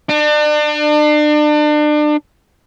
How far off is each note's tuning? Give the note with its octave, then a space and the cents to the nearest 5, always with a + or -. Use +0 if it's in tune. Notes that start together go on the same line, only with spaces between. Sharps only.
D4 +35